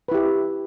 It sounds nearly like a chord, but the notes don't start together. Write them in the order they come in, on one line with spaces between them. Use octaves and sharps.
B4 E4 G4